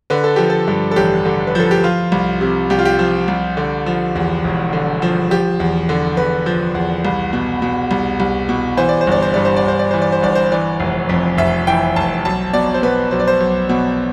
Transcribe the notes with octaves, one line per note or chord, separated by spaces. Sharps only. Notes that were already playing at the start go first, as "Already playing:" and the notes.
D3 B4
A4
F3 G4
A4
G2
A4
A1 G4
D3
B4
F3 A4
G4
F3 F4
C2
C3
C2 G4
F4
G4
F3
C2
D3
F3
E2
E1
D3
F3
F3 G4
E2
D3
E2 B4
F3
E2
C2
B2
B2
C2
C2
B2
E3 C5
D5
C5
G1 D5
C5
G2 D5
C5
D5
G1 C5
D5
E3 C5
D5
C5
G1 D5
C5
E3 D5
F1
F2
F1 E5
E3 G5
F1 A5
B1 A5
B2 D5
C5
B2 B4
B1 C5
D5
C5
B1
B2